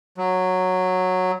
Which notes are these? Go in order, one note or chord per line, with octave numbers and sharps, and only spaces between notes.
F#3